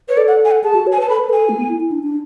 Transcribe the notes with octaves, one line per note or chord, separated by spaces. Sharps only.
B4 C#5
A4 D5
F#5
G#5
F#5
G#4 A5
F#4
C#5
G#5
B4 A5
A4 B5
B4
A4 G#5
A3
B3
E4
E4
D4
D4